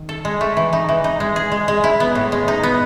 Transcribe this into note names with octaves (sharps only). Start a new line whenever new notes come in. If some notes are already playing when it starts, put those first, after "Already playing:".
Already playing: D#3
A4
G#3
A3
E3
D#4
E3
D#4
G#3
G#4
G#3
G#3
E4
B3
A2
G#3
D#4
B3